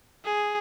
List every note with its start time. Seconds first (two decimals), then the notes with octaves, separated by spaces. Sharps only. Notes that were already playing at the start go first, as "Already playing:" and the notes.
0.25 G#4